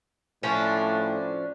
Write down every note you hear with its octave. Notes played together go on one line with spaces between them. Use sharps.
A2 F3 C#4 D4